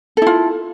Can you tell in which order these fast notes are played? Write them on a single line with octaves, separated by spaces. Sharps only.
A4 E4 F4